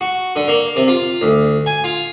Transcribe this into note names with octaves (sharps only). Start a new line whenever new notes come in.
F#4
D3
A#3
C3
F4
D2
G#5
F4